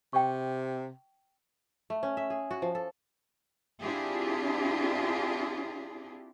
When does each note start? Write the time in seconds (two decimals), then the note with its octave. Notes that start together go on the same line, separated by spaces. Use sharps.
0.13 C3 G5 C#6
1.90 A3
2.03 C#4
2.17 E5
2.30 G#4
2.51 F#4
2.62 F3
2.75 A4
3.81 C4 D4 E4 F4 G4 G#4